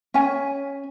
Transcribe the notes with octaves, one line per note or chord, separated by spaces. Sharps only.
C#4 G#5